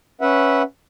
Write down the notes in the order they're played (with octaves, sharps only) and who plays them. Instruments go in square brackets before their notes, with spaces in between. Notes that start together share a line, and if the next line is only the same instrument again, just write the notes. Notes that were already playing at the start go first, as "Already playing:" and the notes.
[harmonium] C#4 B4 E5 F#5